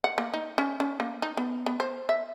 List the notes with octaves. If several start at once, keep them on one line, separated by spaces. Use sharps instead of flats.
F#5
A#3
D#4
C#4
C#4
A#3
D#4
B3
B3
C5
E5